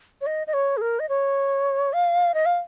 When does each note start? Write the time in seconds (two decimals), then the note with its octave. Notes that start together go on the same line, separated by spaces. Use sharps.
0.21 C#5
0.26 D#5
0.47 D#5
0.53 C#5
0.77 G#4
0.81 A#4
0.99 D#5
1.09 C#5
1.93 F5
2.34 D#5
2.46 F5